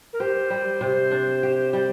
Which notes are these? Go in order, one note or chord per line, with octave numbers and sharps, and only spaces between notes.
A#4
G4 C5
G3
C3
D4
G4
G3